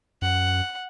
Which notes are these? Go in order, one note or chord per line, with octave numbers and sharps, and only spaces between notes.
F#2 F#5